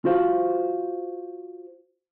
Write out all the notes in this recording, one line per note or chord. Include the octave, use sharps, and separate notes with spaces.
F4 F#4 C5 F5